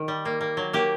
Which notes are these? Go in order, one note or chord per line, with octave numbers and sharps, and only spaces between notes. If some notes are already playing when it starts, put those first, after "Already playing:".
Already playing: D#3
G3
A#3
A#3
F#3
A#3 G4